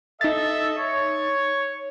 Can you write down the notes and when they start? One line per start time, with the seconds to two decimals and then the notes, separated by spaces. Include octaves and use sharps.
0.21 D#4 A4 D#5 E5 A6
0.78 C#5